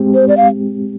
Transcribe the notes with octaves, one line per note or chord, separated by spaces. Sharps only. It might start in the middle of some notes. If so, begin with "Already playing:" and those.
Already playing: G#3 C4 G4
C5
D5
F5